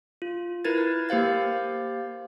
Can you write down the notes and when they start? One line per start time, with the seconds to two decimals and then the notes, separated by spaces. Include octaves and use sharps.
0.22 F4
0.64 E4 A#4 B4 G#6 A6
0.78 A#4
1.09 A#3 G4 C5 F5 A6